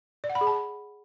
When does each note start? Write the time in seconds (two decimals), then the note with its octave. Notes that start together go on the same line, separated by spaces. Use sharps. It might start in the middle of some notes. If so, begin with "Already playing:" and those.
0.24 D5
0.30 F#5
0.35 B5
0.41 G#4
0.47 A5